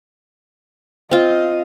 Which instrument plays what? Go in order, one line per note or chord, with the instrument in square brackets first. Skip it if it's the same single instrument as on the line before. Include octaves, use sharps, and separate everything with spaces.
[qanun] C4 F4 [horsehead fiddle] D#5 F5